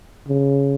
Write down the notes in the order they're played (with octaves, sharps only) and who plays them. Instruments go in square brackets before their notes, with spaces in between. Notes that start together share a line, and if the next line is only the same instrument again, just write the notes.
[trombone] C#3